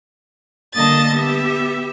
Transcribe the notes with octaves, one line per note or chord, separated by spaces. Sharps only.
D3 G3 A#3 D#5 A5 A6
B3 G4 E5